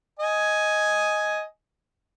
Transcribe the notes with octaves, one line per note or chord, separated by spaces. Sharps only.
D#5 G#5